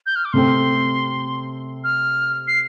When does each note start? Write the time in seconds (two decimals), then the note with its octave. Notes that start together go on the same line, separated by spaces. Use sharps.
0.06 G6
0.16 F6
0.25 D6
0.33 C3 A3 C4 A4 C6
1.84 F6
2.48 C7